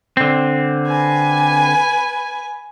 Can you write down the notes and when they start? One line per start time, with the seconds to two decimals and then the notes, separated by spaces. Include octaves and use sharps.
0.17 D3 C4
0.87 B4 G#5